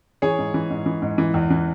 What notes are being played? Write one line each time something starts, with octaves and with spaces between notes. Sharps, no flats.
E3 G#4 C#5
G#2
E3
G#2
E3
G#2
E3
E2
E3